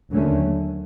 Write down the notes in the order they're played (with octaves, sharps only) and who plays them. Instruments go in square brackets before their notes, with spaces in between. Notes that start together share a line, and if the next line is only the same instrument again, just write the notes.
[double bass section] D#2 D3 F#3 A3 C#4